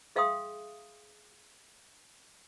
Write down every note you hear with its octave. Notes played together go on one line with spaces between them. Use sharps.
G#4 E5 F5 G5 C6 D#6